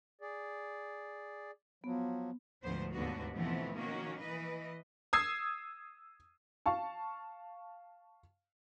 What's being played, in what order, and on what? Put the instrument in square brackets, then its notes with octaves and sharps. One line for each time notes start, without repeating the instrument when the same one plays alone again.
[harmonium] G#4 D5
[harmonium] F3 F#3 [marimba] B3
[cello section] D2 G#2 F3 B3 C5
D#2 G#2 D3 B3 F#4
B2 E3 F3 A3 B3 C4
D#3 A#3 C#4 F#4
E3 B4 D#5
[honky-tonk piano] D#6 E6 G#6 C7
[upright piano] F5 A5 C#6